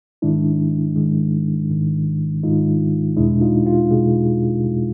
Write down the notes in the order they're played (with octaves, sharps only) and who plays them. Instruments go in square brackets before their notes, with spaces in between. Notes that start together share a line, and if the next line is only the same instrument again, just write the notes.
[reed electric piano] G#2 D#3 G#3 D4 E4
G#2 D#3 G#3
G#2 D#3 G#3
G#2 D#3 G#3 D#4 F4
E2 B2 G#3 D4 E4
D#4 F4
F4 G4
E2 B2 G#3 F#4 G#4
E2 B2 G#3